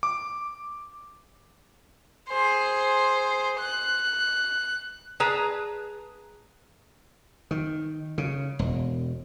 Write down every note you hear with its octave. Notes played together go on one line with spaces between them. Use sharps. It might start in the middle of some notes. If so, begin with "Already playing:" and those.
D6
G#4 C5
F#6
G#4 B4 A5 A#5
D#3
C#3
E1